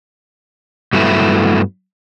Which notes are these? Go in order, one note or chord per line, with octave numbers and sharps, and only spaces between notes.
G2 F#3 A3 B3 E4